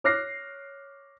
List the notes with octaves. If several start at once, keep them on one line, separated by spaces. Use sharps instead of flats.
C#5 D6 F6 F#6 A#6 C7